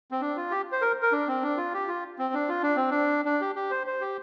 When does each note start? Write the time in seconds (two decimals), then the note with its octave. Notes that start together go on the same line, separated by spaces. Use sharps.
0.11 C4
0.21 D4
0.37 F4
0.51 G4
0.72 C5
0.82 A#4
1.02 A#4
1.12 D4
1.27 C4
1.43 D4
1.57 F4
1.74 G4
1.88 F4
2.19 C4
2.34 D4
2.49 F4
2.63 D4
2.76 C4
2.91 D4
3.25 D4
3.41 G4
3.55 G4
3.71 C5
3.87 C5
4.01 G4